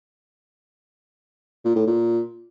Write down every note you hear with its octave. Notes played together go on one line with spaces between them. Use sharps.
A#2
A2
A#2